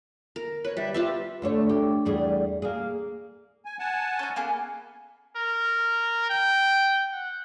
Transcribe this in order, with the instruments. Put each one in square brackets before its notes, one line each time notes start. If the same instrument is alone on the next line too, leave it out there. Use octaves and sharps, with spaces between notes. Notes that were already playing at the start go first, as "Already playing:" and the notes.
[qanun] A#4
[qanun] B4 [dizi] C#5
[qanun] G3 [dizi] E5
[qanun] F4 G4 E5 [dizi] B4
[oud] D2 A3 C#5
G4
E2 G3 G#4
A#3 G#4
[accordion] G#5
F#5 G#5 A5
[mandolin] C#4 D#4
A#3 B3 G#4
[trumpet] A#4
G5
F#5